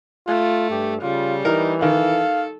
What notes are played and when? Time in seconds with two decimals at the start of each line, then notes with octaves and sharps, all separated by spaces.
0.27 A3 F4
0.71 G2 G4
1.02 C#3 G3 F4
1.45 E3 D#4 A#4
1.82 D#3 A4 F5